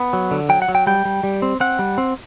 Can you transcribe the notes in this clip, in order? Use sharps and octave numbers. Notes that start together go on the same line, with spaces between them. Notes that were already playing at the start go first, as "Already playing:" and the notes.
Already playing: B3
F#3
D3
F#3 G5
F#5
F#3
G5
G3 G5
G3
G3
C4
C4 F#5
G3
C4